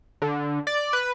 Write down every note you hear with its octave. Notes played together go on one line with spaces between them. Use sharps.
D3
D5
B4